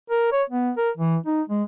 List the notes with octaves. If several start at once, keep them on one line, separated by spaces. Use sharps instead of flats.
A#4
C#5
B3
A#4
E3
D#4
G#3